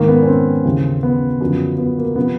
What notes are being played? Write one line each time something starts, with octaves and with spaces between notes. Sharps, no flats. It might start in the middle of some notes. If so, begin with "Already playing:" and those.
Already playing: G#2 D#3 A#3
B3
C#4
C4
D#2 C#3 E3
B3
F#2 D3 F3
B3
A#3
C3 F3 B3